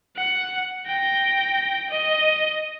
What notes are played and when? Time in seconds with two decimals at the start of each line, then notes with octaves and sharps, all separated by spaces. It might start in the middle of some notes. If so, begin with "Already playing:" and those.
0.17 F#5
0.86 G5 A#6
1.89 D#5